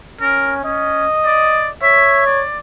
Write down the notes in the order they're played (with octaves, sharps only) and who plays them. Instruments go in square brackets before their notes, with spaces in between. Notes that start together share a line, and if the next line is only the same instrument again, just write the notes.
[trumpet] C#4 [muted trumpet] A#4
[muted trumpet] C#4 [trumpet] D#5
[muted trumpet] D5
[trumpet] C#5 [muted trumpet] E5
[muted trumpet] D5